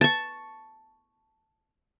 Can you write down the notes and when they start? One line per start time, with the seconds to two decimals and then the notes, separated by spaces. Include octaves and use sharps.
0.01 A5 C#6